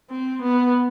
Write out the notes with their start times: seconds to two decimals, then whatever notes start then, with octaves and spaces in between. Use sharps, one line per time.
0.10 C4
0.42 B3